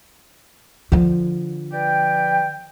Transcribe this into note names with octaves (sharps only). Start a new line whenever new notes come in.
D3 F3
B4 D5 G5